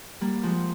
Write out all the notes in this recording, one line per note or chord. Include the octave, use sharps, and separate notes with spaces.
G3 A#3
F3 G#3